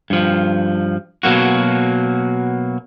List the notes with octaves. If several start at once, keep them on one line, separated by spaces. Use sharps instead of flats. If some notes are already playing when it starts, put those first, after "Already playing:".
G2 F3
B2 F#3 A#3 F#4